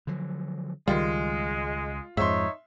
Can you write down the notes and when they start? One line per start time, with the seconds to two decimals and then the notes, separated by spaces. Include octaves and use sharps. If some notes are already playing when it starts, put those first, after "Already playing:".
0.07 D3 F3 F#3
0.88 C#2 D#3 G3 G#3 F4
2.17 F2 G#2 D#4 C#5 E5 C6